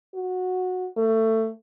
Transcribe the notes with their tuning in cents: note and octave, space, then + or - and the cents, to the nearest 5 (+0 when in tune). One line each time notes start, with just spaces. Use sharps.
F#4 -15
A3 +20